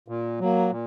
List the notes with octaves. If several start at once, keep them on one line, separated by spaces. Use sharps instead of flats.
A#2
F#3 A#3
A#2